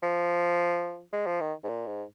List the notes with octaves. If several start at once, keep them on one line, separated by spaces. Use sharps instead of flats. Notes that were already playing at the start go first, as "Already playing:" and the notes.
F3
G#3
F3
D#3
G#2
A#2
G#2